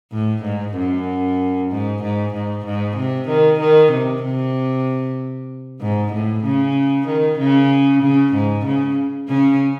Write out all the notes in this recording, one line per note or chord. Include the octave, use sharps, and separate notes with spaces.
A2
G#2
F#2
G#2
G#2
G#2
G#2
C3
D#3
D#3
C3
C3
G#2
A2
C#3
D#3
C#3
C#3
G#2
C#3
C#3 C#4